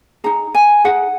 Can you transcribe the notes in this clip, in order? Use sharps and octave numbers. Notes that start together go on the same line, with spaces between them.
D#4 G#4 A#5
G#5
D#4 G#4 F#5